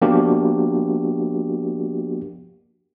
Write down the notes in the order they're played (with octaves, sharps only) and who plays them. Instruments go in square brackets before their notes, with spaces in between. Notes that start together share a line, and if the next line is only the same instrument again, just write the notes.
[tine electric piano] F3 A#3 B3 D4 F#4 G4